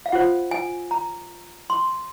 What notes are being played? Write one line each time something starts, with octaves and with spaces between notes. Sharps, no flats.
F5
F4 C5 F#5
G#5
A#5
C6